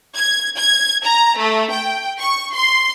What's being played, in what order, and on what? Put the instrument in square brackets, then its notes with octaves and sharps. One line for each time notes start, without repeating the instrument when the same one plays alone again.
[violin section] G#6
G#6
A#5
A3
G5
C#6
C6